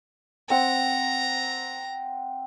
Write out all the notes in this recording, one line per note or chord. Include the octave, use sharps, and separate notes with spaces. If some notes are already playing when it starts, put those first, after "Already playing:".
C4 F#5 A#5